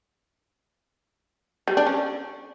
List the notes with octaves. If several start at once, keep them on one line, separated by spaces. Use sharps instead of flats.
G3
D4
C#4